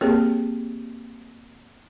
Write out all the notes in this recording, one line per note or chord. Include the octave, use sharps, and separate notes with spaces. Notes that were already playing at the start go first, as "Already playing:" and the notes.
A#3 C4 G4 G#4 A#4 C#5